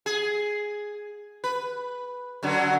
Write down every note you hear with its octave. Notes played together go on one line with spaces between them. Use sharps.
G#4
B4
F#2 D3 F#3